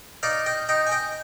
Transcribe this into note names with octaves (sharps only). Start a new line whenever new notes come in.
D#4 D5 F5
D#5 G5
D#4 D#5 G5
G#5
D#5 G5